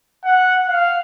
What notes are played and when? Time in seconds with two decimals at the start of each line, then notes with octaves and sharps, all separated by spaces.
0.25 F#5
0.68 F5